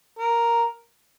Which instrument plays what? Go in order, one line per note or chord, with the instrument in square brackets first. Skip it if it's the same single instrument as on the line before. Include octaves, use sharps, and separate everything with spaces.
[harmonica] A#4